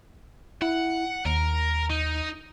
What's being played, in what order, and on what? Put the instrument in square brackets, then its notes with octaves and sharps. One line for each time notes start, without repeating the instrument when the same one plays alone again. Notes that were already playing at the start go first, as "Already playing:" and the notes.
[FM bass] E4 [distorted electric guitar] F#5
[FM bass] D#2 [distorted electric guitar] A#4
[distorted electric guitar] D#4